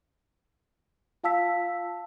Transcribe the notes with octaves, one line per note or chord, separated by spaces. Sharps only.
F4 F5 A5 E6 B6